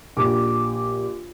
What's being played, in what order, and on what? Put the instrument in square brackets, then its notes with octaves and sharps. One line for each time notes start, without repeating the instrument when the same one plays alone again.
[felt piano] A#1 G4 D6